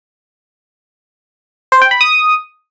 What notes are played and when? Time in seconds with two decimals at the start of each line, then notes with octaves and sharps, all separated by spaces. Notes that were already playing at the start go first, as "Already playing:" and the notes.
1.72 C5
1.82 G5
1.91 B5
2.01 D#6